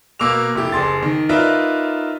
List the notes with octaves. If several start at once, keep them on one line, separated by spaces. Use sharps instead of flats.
B2 A#3 D6 E6 F7
F1 E4 G4
F#1 G#4 C6 A6
D#3
D#4 F4 A#4 B4 D5 E5